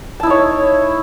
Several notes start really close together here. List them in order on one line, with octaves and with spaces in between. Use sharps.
A5 E4 D#4 C#5